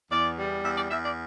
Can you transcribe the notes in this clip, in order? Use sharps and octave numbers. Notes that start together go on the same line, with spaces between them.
E2 D5
G3
E2 E5
D5
E2 E5
D5